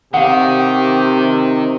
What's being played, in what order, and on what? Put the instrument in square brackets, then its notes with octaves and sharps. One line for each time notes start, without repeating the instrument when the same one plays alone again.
[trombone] C3 [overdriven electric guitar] D#3 [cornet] G4 [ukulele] F5 F#5